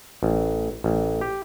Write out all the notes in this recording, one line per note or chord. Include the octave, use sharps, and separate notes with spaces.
A1
A1
G4